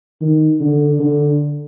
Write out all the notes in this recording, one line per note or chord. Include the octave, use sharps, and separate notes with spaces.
D#3
D3
D3